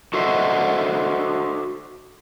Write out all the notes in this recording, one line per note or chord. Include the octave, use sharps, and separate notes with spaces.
F#4 A4 C5 D#5 E5 F#5